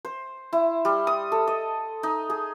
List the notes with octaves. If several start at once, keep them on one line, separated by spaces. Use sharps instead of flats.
C5
E4
G3
D#6
A4
D#5
D#4
G#4